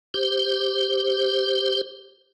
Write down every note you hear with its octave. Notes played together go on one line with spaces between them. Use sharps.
G4 C5